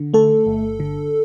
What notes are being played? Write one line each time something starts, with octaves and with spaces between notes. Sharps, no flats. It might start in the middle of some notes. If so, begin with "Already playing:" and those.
Already playing: D3
A3 A4
G1
D3